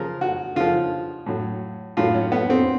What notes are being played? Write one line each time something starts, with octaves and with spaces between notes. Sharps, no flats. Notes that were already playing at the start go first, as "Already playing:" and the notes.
Already playing: C#3 F3 A#4
F#4
C#3 F3 F4
A2 F#3
A2 F#3 F4
C#4
B3
C4